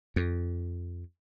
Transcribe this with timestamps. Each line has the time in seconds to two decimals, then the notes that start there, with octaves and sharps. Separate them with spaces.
0.16 F2